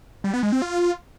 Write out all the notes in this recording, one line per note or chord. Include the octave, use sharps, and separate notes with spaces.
G3
B3
G#3
C4
F4